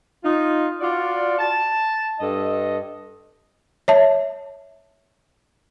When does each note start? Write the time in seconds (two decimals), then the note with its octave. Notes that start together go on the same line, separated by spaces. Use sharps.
0.24 D#4 F4
0.81 F4 F#4 D5
1.38 A5
2.20 G2 A4 D#5
3.88 C#5 E5 A5